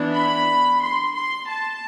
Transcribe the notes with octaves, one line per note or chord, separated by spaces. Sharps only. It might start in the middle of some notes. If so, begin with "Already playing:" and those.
Already playing: E3 B3 D4
B5
C6
C6
A5